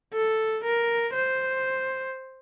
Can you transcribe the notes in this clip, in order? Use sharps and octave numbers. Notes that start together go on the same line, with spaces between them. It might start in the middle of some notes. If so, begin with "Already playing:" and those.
A4
A#4
C5